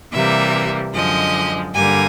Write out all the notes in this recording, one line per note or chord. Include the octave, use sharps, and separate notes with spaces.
C3 E3 G3 A#3 E5
F#2 D3 F3 G#3 D#5
G2 D3 G3 A#3 G#5